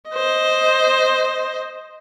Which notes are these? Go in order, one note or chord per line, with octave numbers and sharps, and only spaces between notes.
C5 D#5